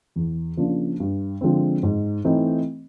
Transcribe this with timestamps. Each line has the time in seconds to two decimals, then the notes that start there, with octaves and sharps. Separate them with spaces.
0.16 E2
0.57 C#3 F3 A#3 D4
1.00 G2
1.41 D3 F3 G#3 C4
1.83 G#2
2.25 E3 A3 C4 D#4